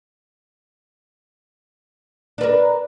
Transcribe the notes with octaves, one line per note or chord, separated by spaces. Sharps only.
D4 A#4 B4